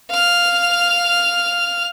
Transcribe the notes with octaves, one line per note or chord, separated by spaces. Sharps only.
F5 F6